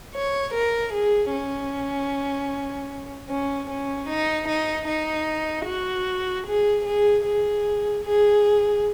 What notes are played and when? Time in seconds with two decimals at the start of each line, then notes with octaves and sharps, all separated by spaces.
0.14 C#5
0.54 A#4
0.93 G#4
1.31 C#4
3.29 C#4
3.70 C#4
4.09 D#4
4.47 D#4
4.87 D#4
5.66 F#4
6.46 G#4
6.85 G#4
7.24 G#4
8.04 G#4